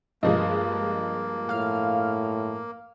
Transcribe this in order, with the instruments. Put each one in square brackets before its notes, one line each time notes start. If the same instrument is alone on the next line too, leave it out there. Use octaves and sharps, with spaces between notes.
[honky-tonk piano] G2 F3 G#3 [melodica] A#3 [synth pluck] D#5
[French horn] A2 [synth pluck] F5 F6